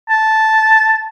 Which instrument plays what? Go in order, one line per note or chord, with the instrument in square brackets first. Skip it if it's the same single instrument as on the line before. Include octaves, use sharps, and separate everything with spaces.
[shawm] A5